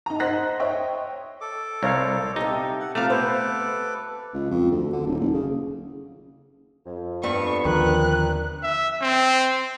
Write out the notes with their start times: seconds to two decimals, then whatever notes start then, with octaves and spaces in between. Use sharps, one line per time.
0.06 D#4 A#5
0.20 C5 D#5 F#5 F#6 A#6 B6
0.60 C5 C#5 D#5 E5 G5 C#6
1.41 A4 D6
1.83 C2 C5 C#5 F5
2.36 C3 D#4 G4 A4
2.80 F#5
2.95 C3 F3 A3 F5 A#5 D6 F6
3.10 B3 A4 B4 C5 D6
4.34 C#2
4.51 F2
4.71 D2
4.93 D3
5.06 D#1
5.20 F#1
5.34 C#3
6.86 F2
7.23 G2 B3 C#6
7.65 D#2 D3 F3 C4 D4 A#4 F#6
8.63 E5
9.01 C4